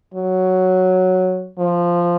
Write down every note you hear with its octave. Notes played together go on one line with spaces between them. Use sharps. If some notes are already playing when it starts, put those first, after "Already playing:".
F#3
F3